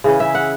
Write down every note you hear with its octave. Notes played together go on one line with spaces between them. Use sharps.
C#3 E3 C#4
E5
F#5